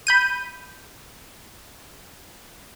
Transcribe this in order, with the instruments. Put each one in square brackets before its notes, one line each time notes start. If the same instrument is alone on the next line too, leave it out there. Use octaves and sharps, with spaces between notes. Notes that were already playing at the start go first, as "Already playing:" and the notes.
[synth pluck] B5 G6 D#7